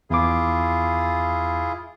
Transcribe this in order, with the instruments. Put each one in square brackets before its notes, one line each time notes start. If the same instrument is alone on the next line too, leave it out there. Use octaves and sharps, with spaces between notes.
[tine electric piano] E2 D6 [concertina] E4 F4 G#4